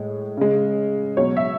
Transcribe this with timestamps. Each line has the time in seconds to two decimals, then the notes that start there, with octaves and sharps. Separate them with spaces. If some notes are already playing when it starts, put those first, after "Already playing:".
Already playing: A2 G#3
0.37 C#3 G#3
1.17 B2 F#3 C#5
1.37 E5